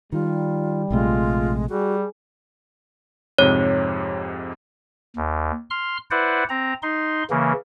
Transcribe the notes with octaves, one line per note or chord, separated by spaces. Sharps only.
D#3 G3 F4
A#1 C3 G#3 A3 F4
G3 F#4 G#4
F2 G#2 C3 C#5
D#2
C6 F6
E4 B4 C5 D5 F#5
C4 A#5
D#4 C6
C#3 E3 A#3